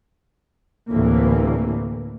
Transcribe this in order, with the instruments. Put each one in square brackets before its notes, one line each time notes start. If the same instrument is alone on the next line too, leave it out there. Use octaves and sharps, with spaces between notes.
[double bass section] D2 A2 C3 E3 A#3